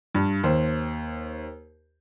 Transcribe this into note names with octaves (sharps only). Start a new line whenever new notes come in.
G2
D#2 C5